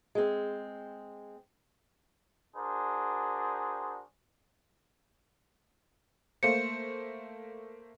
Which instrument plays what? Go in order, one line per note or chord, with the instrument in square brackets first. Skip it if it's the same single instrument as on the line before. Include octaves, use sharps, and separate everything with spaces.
[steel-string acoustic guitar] G#3 C4
[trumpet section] D4 F#4 G#4 A#4 C5
[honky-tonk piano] A3 A#3 C5 [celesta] C#7